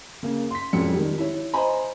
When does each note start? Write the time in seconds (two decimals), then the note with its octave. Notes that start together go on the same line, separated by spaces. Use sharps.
0.23 C#3 A#3
0.51 C6 B6
0.73 E1 F2 C#4 C#7
0.94 D#3 G3
1.18 E4 C#5
1.54 C5 D#5 G#5 A#5 B5